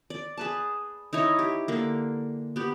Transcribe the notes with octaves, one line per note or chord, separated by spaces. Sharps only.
D5
G#4 B4 A5
D#4 E4 C#5 D#5
G4
D3 A#3
B3 G4